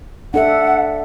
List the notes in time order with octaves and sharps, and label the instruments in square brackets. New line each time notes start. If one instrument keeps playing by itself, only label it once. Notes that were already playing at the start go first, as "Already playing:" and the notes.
[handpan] D4 A4 E5 [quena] F#5